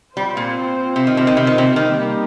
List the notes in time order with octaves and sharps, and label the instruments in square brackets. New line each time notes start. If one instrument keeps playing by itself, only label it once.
[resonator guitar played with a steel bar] G3 [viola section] C4 F4 C5
[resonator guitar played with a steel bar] A#2
C3
D#3
C3
D#3
C3
D#3
C3
[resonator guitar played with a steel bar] D#3 [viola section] G3 A#3 D#4 G4